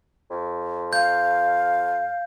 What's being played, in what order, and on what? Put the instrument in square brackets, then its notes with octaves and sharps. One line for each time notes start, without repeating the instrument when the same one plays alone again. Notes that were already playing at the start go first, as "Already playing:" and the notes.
[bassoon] F2
[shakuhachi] F5 [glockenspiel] G6